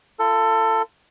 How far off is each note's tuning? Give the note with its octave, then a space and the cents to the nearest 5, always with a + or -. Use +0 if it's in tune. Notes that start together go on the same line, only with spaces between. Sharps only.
F4 -35 A4 +20